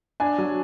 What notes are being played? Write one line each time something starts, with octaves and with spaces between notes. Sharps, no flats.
D4 G#5
F#3